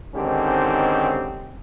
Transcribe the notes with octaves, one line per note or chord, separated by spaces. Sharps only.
G#2 D3 D#3 C4 C#4 G4